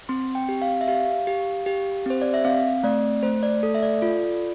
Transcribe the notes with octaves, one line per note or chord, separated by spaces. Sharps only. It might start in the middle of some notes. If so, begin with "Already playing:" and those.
C4 C6
G5
G4
F5
E5
G4 F5
G4
G4
C4 C5
D5
E5
C4 F5
A3 D5
A3 C5
D5
A4
E5
D5
F4